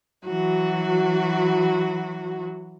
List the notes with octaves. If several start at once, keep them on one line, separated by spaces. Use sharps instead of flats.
E3 F#3 F#4